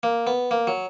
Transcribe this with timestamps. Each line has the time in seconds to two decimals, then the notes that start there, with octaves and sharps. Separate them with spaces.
0.03 A#3
0.27 B3
0.51 A#3
0.67 F#3